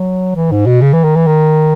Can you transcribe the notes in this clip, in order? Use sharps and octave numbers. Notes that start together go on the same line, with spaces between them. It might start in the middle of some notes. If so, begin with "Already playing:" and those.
Already playing: F#3
E3
G#2
B2
C#3
E3
D#3
E3
D#3